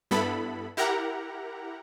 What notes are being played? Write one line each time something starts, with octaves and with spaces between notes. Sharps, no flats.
G2 B3 E4 A4 B5
E4 G4 A#4 F#5 A#5